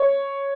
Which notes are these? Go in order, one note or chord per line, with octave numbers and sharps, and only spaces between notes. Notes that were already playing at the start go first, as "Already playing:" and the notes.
Already playing: C#5